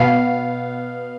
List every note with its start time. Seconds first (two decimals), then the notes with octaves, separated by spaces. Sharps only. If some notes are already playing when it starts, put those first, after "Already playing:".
Already playing: B2 B3 F5